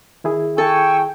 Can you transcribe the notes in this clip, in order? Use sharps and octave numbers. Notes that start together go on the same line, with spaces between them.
D#3 E4 G#4
A4 G5 G#5 C#6 E6